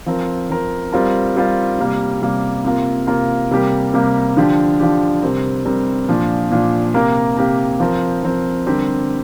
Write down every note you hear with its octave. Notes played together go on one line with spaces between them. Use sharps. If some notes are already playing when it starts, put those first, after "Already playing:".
F3 C4 A#4
F3 C4 A#4
G3 C4 F4 A#4
G3 C4 F4 A#4
C3 G3 A#3
C3 G3 A#3
C3 A#3 F4 A#4
C3 A#3 F4 A#4
C3 G3 A#3 G4 A#4
C3 G3 A#3 G4 A#4
D3 F3 D4 G4
D3 F3 D4 G4
C3 G3 C4 A#4
C3 G3 C4 A#4
A#2 F3 D4
A#2 F3 D4
C3 A#3 G4 A#4
C3 A#3 G4 A#4
F3 C4 A#4
F3 C4 A#4
D3 G3 C4 G4 A#4